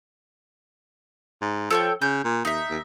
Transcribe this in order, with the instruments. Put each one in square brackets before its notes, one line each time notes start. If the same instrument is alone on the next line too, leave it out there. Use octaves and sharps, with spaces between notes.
[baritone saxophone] G#2
[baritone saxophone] F3 [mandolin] A4 C#5 G5
[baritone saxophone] C#3 [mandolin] G6
[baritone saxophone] A#2
[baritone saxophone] D#2 [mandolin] D#4 E5
[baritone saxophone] D#2